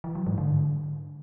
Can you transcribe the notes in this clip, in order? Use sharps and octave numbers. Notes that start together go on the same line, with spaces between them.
E3
F#3
G#2
D3